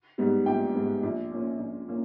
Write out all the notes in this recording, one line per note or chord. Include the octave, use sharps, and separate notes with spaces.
G#2 G3 B3
A#1 G5
G#2 G3 B3
A#1
A#2 A#3 C#4
A#1
A#2 A#3 C#4